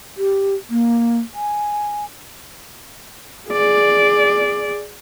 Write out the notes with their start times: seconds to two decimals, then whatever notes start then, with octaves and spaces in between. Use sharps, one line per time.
0.17 G4
0.70 A#3
1.34 G#5
3.50 G#4 D5